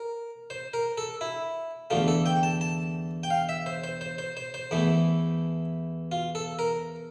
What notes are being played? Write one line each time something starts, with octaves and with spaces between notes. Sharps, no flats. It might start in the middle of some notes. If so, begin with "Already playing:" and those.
Already playing: A#4
C5
A#4
A4
E4
E2 D3 A3 F4
A4
G5
A5
A5
G5
F5
E5
C5
C5
C5
C5
C5
C5
E2 E3 A3
F4
A4
A#4